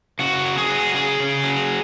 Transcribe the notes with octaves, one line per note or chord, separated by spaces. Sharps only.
C#3 F#4
F#3
G#4
F#3
C#3 G#4
C#3
F#3